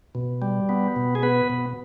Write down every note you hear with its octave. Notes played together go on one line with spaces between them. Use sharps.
B2
G3
B3
B2
G#4
B3 B4
B2